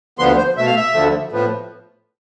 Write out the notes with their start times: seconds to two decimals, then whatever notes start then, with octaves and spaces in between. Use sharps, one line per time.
0.19 D2 D3 F3 B3 C6
0.38 C5
0.57 B2 A3 E5
0.66 F5
0.76 E5
0.94 D2 D3 F3 A3
1.32 A2 F3 B3